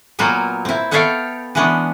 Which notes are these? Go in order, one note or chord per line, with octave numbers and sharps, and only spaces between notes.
A#2 F#3 A#3 B3 F4
C4 E4
B3 A4 C#5 E5 F5 G5
E3 G#3 B3 C#4 D4